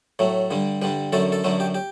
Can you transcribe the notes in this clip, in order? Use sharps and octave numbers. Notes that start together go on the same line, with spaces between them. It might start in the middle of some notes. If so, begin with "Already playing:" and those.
A2 F#3 A3
G2 D3 G3
G2 D3 G3 B4
F#2 D3 F#3 A3 A4
A4
F#2 D3 F#3 A3 B4
G4
G4